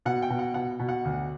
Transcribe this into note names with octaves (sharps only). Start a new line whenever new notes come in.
B2 F#5
G5
B2
F#5
B2 F#5
B2
F#5
D2